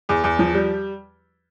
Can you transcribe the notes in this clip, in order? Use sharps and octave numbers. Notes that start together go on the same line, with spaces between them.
E2
E2
F3
G3